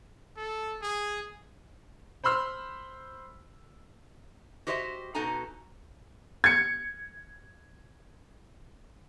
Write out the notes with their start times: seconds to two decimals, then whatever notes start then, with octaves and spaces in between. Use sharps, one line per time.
0.37 A4
0.82 G#4
2.24 C5 B5 C6 E6 F6
4.67 F#4 G4 C5 C#5 D#5 E5
5.15 B2 D#4 F#4 A4 G#5 A#5
6.44 G#6 C#7